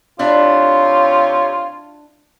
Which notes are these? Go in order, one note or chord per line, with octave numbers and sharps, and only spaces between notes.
C3 D4 E4 F4 G4 C#5